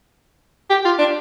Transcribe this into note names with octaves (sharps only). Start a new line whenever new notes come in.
G4
F4
D4